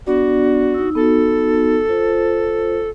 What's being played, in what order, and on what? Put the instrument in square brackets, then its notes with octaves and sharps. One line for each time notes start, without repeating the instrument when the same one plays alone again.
[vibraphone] B3 D4 D5 [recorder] F#4
[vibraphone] D#4 E6
[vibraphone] B3 D#4 F#4 [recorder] A4
[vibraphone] F4 C5